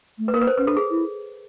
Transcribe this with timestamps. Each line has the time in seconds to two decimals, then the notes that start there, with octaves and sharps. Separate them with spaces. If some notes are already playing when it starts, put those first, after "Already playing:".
0.19 A3
0.28 B4
0.33 A#3 A#4
0.41 B4
0.47 C5
0.58 C#4 B4
0.67 D4 A4
0.77 G#4
0.91 E4